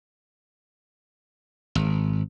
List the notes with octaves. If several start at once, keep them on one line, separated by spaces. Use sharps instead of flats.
G#1